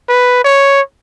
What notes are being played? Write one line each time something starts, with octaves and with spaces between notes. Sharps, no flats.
B4
C#5